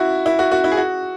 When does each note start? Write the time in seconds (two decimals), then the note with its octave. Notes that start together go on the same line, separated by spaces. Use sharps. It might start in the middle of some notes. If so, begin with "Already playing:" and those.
Already playing: E4 F#4
0.26 E4
0.39 F#4
0.52 F#4
0.64 E4
0.72 G#4
0.77 F#4